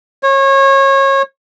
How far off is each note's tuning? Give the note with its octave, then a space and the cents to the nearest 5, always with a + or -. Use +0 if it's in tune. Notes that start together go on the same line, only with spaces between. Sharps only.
C#5 -25